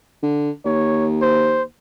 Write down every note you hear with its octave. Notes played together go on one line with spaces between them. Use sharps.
D3
D#2 C#5
C5